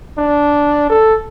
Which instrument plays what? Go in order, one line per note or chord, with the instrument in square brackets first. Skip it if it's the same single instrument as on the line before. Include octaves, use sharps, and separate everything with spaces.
[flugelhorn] D4
A4